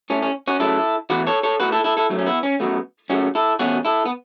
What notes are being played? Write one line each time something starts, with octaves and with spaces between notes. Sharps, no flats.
A2 A3 C#4
C#4
C#4 F#4
F#2 C#3 F#3 A3 E4 A4
E2 E3 A3 F#4 B4
A4 C#5
A4 C#5
A2 A3 F#4 B4
E4 A4
E4 A4
E4 A4
F#2 F#3 A3
C#4
B3 E4
C#4
F#2 F#3 A3 B3
F#2 C#3 A3 C#4 F#4
E4 A4
E2 B2 A3 C#4 F#4
E4 A4
B3